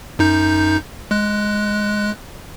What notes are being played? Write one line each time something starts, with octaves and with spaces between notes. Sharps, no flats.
F#2 D#4 G6
G#3 F#6